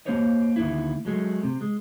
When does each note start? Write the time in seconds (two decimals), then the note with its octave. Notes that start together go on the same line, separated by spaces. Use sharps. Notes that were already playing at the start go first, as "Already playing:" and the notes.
0.05 A#3 B3 G4 C5 C#5 D#5
0.56 D2 D#3 A#3 E4
1.05 F#3 G#3 A3
1.43 C3
1.61 G#3